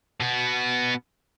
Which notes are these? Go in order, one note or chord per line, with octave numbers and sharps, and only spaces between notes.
B2 B3